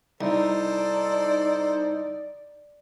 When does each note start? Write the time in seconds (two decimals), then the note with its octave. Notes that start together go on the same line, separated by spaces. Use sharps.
0.21 C2 D#4 A4 C5 D5